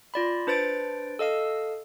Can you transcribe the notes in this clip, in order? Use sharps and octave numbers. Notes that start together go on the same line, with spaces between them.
F4 D5 B5
D4 B4 C5 A6 D7
A4 D#5 F5 E6